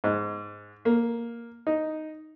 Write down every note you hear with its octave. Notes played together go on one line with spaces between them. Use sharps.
G#2
A#3
D#4